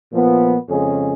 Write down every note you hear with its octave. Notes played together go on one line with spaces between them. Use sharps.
A#2 F3 B3
F2 C#3 G#3 C#4 G#4